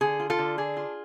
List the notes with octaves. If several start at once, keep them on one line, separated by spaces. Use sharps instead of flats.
D3 G#4
F4
F4 A4
D3
D4 G#4
F4